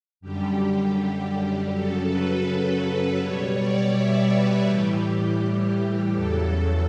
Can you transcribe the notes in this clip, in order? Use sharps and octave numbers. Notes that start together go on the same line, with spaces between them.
F#2 D3 G3 G4
F#2 C#3 F#3 A4
B4
B2 G3 C#5
D5
E5
B4
A2 E3 G3 G4
E2 C#3 F#3 A4